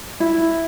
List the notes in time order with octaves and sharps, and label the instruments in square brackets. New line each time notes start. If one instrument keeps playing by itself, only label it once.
[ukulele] E4